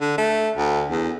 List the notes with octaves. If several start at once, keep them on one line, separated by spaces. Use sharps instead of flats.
D3
A3
D2
E2